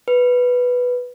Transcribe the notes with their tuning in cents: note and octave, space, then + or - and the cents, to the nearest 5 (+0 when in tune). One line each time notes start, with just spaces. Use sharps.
B4 +0